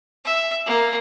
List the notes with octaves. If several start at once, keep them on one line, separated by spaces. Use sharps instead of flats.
E5
A#3